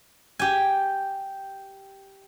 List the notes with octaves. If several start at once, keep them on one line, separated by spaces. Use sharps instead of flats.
G4 G#5